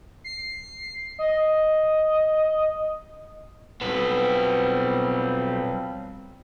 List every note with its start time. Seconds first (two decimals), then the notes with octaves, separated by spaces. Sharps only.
0.24 C7
1.19 D#5
3.82 B1 F3 G3 B3 C4